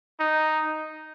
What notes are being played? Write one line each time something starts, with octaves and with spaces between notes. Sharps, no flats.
D#4